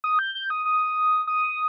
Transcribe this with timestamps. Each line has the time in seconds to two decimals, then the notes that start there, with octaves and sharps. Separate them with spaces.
0.04 D#6
0.19 G6
0.35 G6
0.50 D#6
0.65 D#6
1.27 D#6